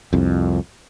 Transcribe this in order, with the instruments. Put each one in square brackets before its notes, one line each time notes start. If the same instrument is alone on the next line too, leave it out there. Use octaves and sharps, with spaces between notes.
[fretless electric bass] C2 F2